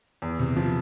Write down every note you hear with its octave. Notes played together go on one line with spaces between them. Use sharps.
E2
C3
F3